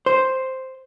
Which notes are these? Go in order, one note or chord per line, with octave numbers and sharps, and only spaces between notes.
C5